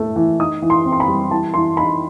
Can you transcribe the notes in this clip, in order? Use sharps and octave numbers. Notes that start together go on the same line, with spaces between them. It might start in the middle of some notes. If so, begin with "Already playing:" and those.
Already playing: A2 A3
E3
D#4 D#6
E3
C6
C4
C6
B5
G3
E3 A5
E3 C6
D#4 B5